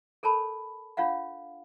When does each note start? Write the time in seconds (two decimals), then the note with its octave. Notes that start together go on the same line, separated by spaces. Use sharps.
0.23 A4 A#4 C#5 A5 B5
0.97 D4 F4 C#5 F5 F#5